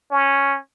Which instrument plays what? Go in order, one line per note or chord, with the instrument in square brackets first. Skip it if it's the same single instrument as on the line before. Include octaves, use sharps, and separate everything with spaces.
[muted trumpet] C#4